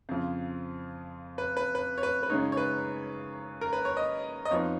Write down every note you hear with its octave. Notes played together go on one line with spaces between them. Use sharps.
F2 C#3 F3
B4
B4
B4
C#5
B4
B4
F#2 C#3 G#3 D#4 C#5
C#5
B4
A#4
B4
C#5
D#5
D#5
F2 F3 B3 D#4 C#5